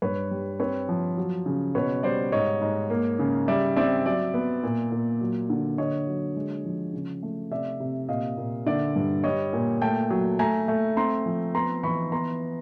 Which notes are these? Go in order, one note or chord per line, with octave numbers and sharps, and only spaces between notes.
G2 B4 C#5
G3
C4 B4 C#5
F3
F#3
C#3
B2 B4 C#5
G3 C5 D5
G#2 C#5 D#5
G#2
A#3
C#3
G3 D5 E5
C4 D5 E5
F#3 D5 E5
B3
A#2
A#2
F#3
D3
D3 C#5 D#5
F#3
G#3
F3
C#3
A3
C3 D5 E5
C3
A#2 D#5 F5
A#2
D3 D5 E5
G2
G3 C#5 D#5
A#2
A3 G5 A5
F#3
A3 G#5 A#5
A3
C4 A#5 C6
F3
B3 A#5 C6
E3 B5 C#6
B3 A#5 C6